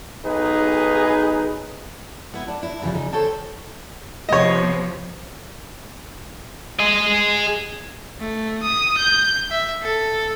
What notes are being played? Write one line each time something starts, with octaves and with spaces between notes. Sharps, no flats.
B1 D#4 G#4 B4
B3 E4
D4
E4
C#3 E3 F3 G3
C#3 D#4
A4 C5 C#5 G5 A5
C3 F3 B3 C#5 D#5
G#4 D#5
A3
D#6
G6
E5
A4